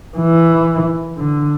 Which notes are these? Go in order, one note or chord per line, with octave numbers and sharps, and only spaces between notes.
E3
D3